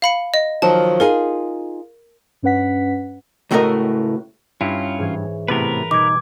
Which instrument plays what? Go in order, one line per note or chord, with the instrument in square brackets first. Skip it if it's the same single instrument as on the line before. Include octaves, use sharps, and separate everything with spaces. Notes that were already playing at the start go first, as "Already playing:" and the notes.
[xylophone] F5 B5 C#7
D#5
[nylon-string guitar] D#3 F3 F#3 [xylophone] A5
[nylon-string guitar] D#4 F4 G#4 [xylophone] A#4
[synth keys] G2 C#4 B4 F#5 B6
[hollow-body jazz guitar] C#2 A2 A3 F#4 A#4 D#5
[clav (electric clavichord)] G2 E4 [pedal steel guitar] C#4 F4
[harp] G#2 E3 C#5
[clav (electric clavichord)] A2 C3 B3 [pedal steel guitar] A#4 B4
[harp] B2 G3 [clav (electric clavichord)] D#4 [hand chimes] D6 G#6